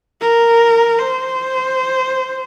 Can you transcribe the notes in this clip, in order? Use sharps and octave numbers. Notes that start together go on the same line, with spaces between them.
A#4
C5